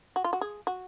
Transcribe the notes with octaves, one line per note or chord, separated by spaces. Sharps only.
F#4
F4
F#4
G#4
F#4